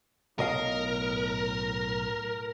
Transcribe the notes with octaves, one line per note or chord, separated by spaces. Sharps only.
B1 A2 A#4 D#5 F5